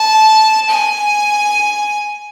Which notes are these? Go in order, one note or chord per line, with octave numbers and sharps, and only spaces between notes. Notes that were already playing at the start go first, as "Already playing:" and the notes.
Already playing: A5
G#5